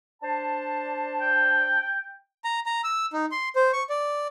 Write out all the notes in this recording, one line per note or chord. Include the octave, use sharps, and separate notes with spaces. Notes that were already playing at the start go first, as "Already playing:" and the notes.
D4 C5 A5
G5
A#5
A#5
E6
D#4
C6
C5
C#6
D5